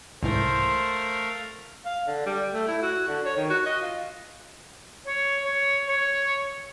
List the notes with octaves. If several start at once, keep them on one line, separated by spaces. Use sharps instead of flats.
C2 G#2 E3 A3 A#4 C5 F5
F5
D3
G3
A3
E4
F#4
D3
C#5
D#3
F#4
D#5
F4
C#5
C#5
C#5